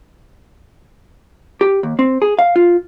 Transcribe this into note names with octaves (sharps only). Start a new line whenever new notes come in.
G4
D#2
C4
G#4
F5
F4